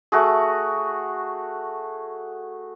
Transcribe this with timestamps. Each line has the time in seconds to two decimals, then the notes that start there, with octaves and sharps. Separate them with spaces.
0.12 A3 F#4 G#4